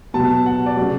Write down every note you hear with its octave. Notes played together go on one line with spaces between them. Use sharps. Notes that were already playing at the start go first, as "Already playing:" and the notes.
B2 F#3 A5
F#5
D5
C#3 F#3